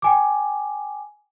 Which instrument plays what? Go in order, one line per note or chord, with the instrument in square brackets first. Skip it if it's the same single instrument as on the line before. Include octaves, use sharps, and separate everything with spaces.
[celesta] G5 G#5 D6